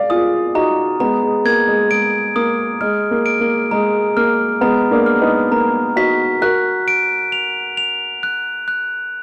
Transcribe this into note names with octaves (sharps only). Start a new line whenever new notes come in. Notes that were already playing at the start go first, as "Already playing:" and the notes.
Already playing: D5 F5
F4 G#4 D#6
D#4 F#4 A#5
G#3 B3 A#5
G#3
A#3 G#6
G#3
G#3 D7
A#3 D#6
G#3 F6
A#3
D7
A#3
G#3 A#5
A#3 F6
G#3 B3 A#5
A#3 D4
F6
B3 D#4
A#3 A#5
D#4 F#4 B6
F#4 A#4 F#6
D7
F7
F7
F#6
F#6